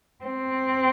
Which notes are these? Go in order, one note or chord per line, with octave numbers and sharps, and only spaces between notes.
C4